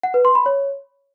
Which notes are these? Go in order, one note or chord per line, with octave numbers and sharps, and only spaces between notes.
F#5
B4
C6
B5
C#5